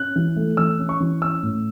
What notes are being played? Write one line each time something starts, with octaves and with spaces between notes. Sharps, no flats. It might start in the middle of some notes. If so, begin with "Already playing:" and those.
Already playing: C#4 F#6
E3
A3
E3 E6
C#4
C#6
E3
C#4 E6
A2